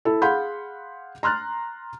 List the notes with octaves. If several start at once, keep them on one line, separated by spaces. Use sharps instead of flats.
E4 A4
G#4 F5 F#5 B5 C6 G6
A#5 C6 F6 F#6 A6